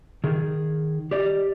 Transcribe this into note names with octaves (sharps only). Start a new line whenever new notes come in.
D#3 G#4
G4 D5 D#5